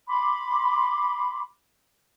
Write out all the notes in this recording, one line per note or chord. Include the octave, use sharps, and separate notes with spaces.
B5 C6 D6